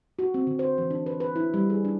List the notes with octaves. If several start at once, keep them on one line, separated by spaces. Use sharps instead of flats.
F#4
C4
D3
C5
E3
D4
B4
B4
E4
G3
G#4
D4